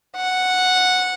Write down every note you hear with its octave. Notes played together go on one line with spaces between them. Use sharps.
F#5